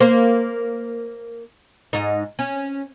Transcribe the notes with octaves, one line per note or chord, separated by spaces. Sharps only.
A#3 C5
G#2 D#4
C#4